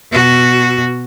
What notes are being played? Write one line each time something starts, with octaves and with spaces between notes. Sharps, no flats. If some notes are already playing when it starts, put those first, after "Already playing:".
B2 F#4